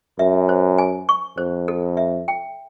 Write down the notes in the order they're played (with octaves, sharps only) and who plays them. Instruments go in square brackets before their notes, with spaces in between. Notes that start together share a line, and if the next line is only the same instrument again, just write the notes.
[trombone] F#2 [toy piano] E5
[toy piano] C5
G#5
C#6
[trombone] F2 [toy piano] C5
[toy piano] A4
E5
G5